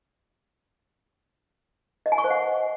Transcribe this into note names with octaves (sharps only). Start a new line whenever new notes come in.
D#5
G#5
C#6
C5
F#5